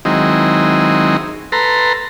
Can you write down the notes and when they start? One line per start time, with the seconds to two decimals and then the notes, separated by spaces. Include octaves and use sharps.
0.05 D#3 F#3 G#3 C4 D#4 E4
1.52 A4 B4 A#5 C6